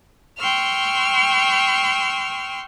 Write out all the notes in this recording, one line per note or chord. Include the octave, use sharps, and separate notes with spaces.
G5 C6 C#6 E6 F6